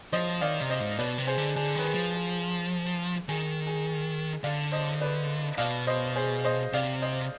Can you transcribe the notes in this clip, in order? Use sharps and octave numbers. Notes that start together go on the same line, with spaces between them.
F3 C5 D#5
D#3 D5 F5
C3
C5 D#5
G#2
B2 B4 D5
C3
G#4 C5
D3
D3 G#4
D#3 B4
G#4
F3
G#4
D#3 G#4
G#4
D3 D5 F5
C5 D#5
B4 D5
B2 D5 F5
C5 D#5
G#4 C5
C5 D#5
C3 D5 F5
C5 D#5